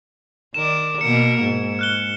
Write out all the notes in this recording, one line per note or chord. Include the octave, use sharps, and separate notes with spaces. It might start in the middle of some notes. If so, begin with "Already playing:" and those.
D#3 A#4 D5 E7
B2 A#3 A#4 C#7
G#2
F6 F#6 G7